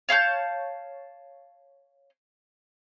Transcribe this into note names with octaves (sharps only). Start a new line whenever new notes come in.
C#5 F5 A5 G6